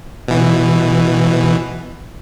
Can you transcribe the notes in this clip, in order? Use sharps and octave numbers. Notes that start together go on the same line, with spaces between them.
B2 E3